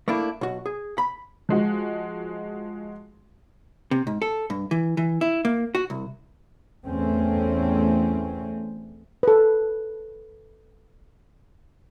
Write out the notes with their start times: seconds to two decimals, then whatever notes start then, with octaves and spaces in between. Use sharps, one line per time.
0.08 A3 A#3 D4 E4
0.41 B1 F#4
0.66 G#4
0.98 B5
1.49 F3 G#3 F#4
3.91 C3
4.07 G#2
4.22 A4
4.50 G2
4.71 E3
4.97 E3
5.21 E4
5.45 A#3
5.75 F#4
5.90 C2
6.86 E2 A3 C4 C#4
9.23 A4 B4